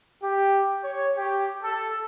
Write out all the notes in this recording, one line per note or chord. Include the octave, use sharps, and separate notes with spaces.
G4
C#5
G4
A4